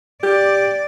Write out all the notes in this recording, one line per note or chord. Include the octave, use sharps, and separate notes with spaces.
G4 D5